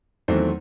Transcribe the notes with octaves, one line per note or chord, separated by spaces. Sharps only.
E2 D#3 F#3 A3 C4 C5